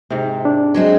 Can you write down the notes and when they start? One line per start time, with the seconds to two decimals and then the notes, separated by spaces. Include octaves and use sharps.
0.10 G#2 C3
0.45 D4
0.74 F#3 G#3 C4